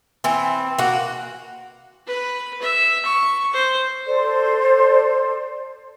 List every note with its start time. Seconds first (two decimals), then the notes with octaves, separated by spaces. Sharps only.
0.24 E3 C4
0.79 A#3 F#4
2.07 B4
2.62 E5
3.05 C#6
3.53 C5
4.06 A4 C5 D5